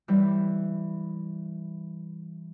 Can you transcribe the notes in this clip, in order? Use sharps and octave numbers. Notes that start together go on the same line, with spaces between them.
E3 G3